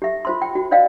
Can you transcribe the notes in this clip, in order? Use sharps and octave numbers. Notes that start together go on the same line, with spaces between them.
G4 E5
F4 C5 C6
G5
F#4
C5 D5 D#5 F5 G5